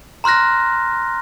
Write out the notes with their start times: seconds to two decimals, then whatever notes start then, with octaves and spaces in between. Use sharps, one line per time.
0.24 A#5 C6 F6 F#6 A#6